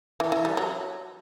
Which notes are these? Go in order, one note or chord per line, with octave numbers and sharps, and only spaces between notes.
E3
E3
G3
F#3